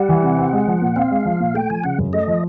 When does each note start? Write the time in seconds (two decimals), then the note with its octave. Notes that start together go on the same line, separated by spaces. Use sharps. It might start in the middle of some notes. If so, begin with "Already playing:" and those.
Already playing: G3 F#5
0.09 E3
0.23 C3
0.38 C4
0.53 G#3
0.67 F3
0.82 A#2
0.96 C4 F5
1.11 G#3
1.25 F3
1.40 A#2
1.54 A3 G5
1.70 F3 G#5
1.84 C#3 F#5
1.98 F#2
2.13 A3 D#5
2.27 F3